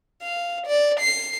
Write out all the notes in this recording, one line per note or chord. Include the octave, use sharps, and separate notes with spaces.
F5
D5
C7